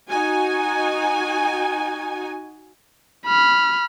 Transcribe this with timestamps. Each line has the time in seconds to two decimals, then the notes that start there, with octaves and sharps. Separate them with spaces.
0.11 D#4 F#4 G#5
3.26 B5 F6